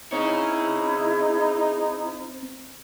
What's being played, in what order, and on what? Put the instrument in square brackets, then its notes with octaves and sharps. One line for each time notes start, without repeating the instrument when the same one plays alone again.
[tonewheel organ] C4 [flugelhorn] D#4 [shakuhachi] E4 [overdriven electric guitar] G#4 C#5